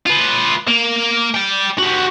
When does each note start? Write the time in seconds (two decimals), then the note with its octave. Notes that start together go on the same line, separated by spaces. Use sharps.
0.06 F4 B4
0.67 A#3
1.34 D5 G5
1.78 F#4 G4